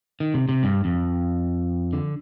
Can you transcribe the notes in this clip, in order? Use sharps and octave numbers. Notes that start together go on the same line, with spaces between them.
D#3
C3
C3
G2
F2
D3